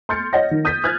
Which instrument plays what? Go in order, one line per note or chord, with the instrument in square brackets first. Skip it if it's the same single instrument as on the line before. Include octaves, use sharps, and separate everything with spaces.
[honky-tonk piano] C6 F6 G6 A6 C#7
C#5 D#5 F#5 A#6
D#3
D#6 G6 A6 B6
F6 F#6 G#6 A6